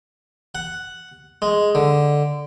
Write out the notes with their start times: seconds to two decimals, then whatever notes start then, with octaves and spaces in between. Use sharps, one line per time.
0.55 F#5
1.42 G#3
1.75 D3